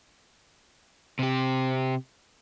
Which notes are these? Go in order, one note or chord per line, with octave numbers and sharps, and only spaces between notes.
C3 G4